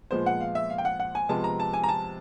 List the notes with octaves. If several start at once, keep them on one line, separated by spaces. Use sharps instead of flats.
A#2 F3 G#3 B3 C5
F#5
F5
E5
F5
G5
F#5
F#5
G#5
C3 F3 G#3 B3 A5
A#5
A5
G#5
A#5
A5